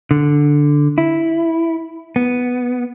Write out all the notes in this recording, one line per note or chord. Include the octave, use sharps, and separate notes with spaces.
D3
E4
B3